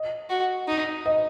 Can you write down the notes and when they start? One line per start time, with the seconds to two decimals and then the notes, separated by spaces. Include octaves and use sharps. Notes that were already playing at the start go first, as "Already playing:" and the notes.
Already playing: D#5
0.30 F#4
0.68 D#4
1.06 D#5